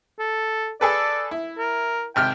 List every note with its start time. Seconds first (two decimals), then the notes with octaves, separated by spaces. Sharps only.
0.19 A4
0.81 G#4 A4 B4 D5
1.31 E4
1.59 A#4
2.16 G#1 C3 G5 F6